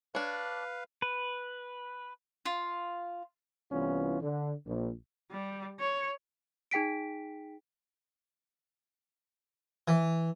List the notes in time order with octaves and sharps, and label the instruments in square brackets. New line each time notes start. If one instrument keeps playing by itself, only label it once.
[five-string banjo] D4 C#5 [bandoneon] B4 F5
[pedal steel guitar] B4
[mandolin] F4
[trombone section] C2 E3 B3 C#4 F4
D3
A#1
[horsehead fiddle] G3
C#5
[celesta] D#4 G#4 G5 B6 D7
[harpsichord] E3